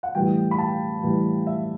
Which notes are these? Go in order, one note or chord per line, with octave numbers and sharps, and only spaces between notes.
F#5
A2 E3 G3 G5
B5
A5
A2 E3 G3
E5